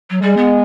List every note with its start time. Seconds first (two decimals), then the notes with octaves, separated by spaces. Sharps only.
0.10 F#3
0.22 G3 G#3
0.37 B3